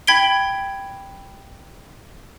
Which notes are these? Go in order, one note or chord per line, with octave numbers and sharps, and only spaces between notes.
G5 B5 G#6 B6 D7 G7